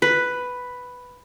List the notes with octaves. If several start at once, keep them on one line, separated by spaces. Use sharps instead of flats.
B4